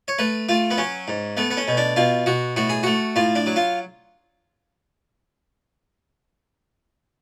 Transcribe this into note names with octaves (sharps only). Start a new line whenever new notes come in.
C#5
A3 B4
A3 F4
B3
F#3 C#4
G#2
A3 B3
B3
C#4
B2
D4
B2 F4
B2 F#4
A2 F#4
G#4
A3 F#4
A2 F4
D4
F#3
F4